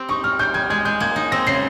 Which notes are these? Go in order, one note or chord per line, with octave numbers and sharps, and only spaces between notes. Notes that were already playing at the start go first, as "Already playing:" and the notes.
Already playing: C4 G4
D#4 C#6
D#4 F6
G3 G6
G3 G#6
G#3 G#6
G#3 G6
A#3 G#6
D#4
C4 A#6
C#3 C7